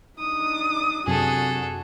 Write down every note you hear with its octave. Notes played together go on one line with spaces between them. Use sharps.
D4 D#4 D#6
F#2 C3 D4 F#4 G#4 A4